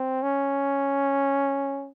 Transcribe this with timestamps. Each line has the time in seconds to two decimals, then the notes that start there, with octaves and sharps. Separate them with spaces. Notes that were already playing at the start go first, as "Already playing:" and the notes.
Already playing: C4
0.23 C#4